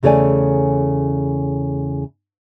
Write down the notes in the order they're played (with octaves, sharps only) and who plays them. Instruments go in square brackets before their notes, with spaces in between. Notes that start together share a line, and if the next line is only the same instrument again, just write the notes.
[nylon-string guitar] E2 C#3 A3 C#5 D5 G#5